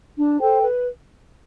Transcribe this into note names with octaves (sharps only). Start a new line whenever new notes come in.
D4
A4 C5 G5
B4